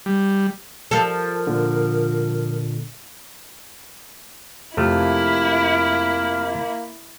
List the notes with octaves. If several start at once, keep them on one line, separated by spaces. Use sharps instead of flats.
G3
F3 A4 A#4
A#2 D3
F2 C3 A3 A#3 E4 F6